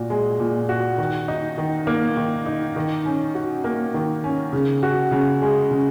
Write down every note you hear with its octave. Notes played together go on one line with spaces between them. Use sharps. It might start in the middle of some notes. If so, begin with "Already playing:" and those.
Already playing: A#2 F#4
G#3
A#2
F#4
D#3
D#4
D#3
A#3
D#3
D#4
D#3
C#4
F#4
A#3
D#3
C#4
C#3
F#4
C#3
G#3
C#3